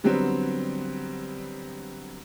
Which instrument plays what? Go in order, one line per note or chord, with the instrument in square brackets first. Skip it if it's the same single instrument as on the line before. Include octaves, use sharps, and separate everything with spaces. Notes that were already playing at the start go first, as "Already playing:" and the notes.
[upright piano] D3 F#3 G3 B3 C4